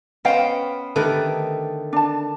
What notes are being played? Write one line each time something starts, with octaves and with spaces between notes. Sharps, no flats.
B3 C#4 C5 D#5 F5 G5
D3 D#3 A3 D#4 G4 B4
D4 A5